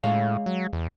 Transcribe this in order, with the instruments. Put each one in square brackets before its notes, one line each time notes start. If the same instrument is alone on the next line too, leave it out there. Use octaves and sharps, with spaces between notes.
[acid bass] A2 [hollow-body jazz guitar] G#3 C#5 F5
[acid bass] F#3
E2